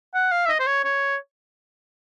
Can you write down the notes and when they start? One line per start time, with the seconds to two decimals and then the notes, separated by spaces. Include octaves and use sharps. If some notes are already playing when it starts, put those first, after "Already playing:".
0.15 F#5
0.32 F5
0.46 E5
0.49 D#5
0.59 C5
0.67 C#5
0.85 C#5